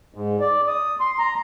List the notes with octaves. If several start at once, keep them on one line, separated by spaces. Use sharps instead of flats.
G#2
D5
D#6
C6
A#5